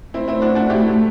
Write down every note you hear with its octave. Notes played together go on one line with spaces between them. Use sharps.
A3 C4 E4
C4 E4
D4 F#4
D4 F#4
E4 G4